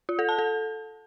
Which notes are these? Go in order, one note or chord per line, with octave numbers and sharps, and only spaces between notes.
F4
A4
A5
A4